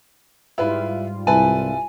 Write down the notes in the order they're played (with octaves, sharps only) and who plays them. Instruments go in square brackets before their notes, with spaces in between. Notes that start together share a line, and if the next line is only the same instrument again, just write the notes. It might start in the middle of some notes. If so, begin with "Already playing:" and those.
[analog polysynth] G#2 G3 F4 [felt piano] E4 B4
[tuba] C2 [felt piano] E4 B4 A5 [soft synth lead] G#5